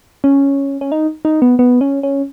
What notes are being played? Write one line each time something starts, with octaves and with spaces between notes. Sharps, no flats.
C#4
C#4
D#4
D#4
B3
B3
C#4
C#4